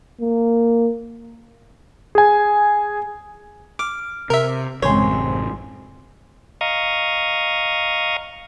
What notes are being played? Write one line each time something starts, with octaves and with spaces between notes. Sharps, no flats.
A#3
G#4 G#5
D6 F6
C3 A#4 E5
A1 F#2 C#3 G#3 C4 C5 C#5 G#5
D#5 F5 A#5 C#6 D#6